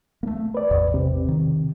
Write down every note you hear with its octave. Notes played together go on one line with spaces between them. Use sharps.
A3 A#3
B4 D5
A1 E2
C3
D#3